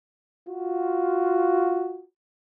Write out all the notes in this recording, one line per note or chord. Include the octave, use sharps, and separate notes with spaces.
F4 F#4